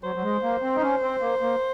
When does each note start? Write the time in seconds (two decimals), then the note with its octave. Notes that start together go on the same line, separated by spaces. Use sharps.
0.03 F#3 C5
0.15 F#3
0.23 G#3
0.43 A#3
0.62 C4
0.76 D#4
0.82 C#4
1.02 C4
1.21 A#3
1.42 A#3